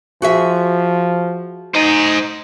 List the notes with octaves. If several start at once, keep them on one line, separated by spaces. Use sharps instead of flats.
F3 F#4 G#4 E5
D#4 C5 G#5